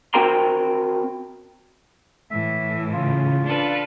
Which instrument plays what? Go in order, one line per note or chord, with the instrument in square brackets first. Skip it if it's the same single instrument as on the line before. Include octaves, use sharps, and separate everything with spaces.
[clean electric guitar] C4 F#4 A#4 G5 A#5 C6
[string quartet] A2 E3 [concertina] E5
[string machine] C#3 [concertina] F4
[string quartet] D4 A4 B4 [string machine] F5